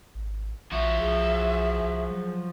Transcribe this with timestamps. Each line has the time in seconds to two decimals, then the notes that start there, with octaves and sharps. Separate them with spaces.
0.15 G#1
0.72 A#1 F3 F#4 E5
1.00 B1 G#4
1.82 C2
2.11 F#3